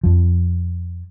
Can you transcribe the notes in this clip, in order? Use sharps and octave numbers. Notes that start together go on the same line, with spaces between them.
F2 F3